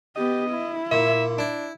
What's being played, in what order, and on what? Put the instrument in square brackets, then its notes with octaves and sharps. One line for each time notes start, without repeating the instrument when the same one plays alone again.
[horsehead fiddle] B3 G4 [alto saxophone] D#5
[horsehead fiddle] E4
[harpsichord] A#2 [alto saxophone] E5
[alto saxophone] D4 [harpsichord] E4